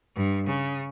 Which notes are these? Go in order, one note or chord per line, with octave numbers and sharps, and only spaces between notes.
G2
C#3